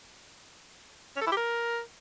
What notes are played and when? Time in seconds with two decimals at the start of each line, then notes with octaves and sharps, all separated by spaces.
1.16 C#4
1.21 A4
1.27 E4
1.32 G4
1.37 A#4